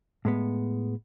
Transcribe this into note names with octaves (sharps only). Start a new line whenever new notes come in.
A2 G#3 B3